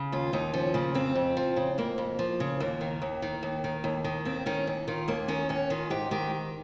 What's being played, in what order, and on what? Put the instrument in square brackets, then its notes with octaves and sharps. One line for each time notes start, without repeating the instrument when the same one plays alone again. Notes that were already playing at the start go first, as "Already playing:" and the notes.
Already playing: [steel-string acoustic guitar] C#3
D#2 F4
D#2 D#4
F3 C#4
C#3 A#3
F2 C4
F2
F3
C#3
F2 A#3
F2
F3
C#3
D#2 A#3
D#3
D#2
D#3
D#2
D#3
D#2
D#3
D#2 C4
D#3 C#4
D#2
D#3 F4
D#2 A#3
D#3 C#4
D#2 C#4
D#3 F4
G#2 G4
D#3 G4